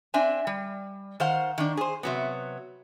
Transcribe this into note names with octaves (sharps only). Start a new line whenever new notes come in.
C4 D4 E5 G#5
G3
D#3 C5 F5 F#5
D#3 D4
G#4 C5
C3 F#3 B3